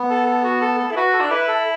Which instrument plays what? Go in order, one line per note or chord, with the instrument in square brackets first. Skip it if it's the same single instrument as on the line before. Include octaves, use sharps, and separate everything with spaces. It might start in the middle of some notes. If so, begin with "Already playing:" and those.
Already playing: [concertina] B3
[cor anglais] A4
A4
F#4
A4
A4
E4
[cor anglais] F#4 [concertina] B4
[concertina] A4
[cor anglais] D4
[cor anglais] E4 [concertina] B4
[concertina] A4